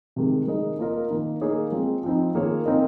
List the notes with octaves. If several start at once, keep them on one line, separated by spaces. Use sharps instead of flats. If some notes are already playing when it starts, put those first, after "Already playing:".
C3 D#3 G#3
G#3 D#4 A#4 D#5
A#3 F4 A#4 D#5
D#3 A#3 D#4
A#3 D#4 G#4 C#5
G#3 C4 F4
F3 C4 D#4
D#3 A#3 F4 G#4 C#5
C4 D#4 A#4 D#5